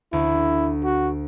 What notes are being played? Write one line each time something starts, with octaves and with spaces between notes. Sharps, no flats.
D2 E4
F#4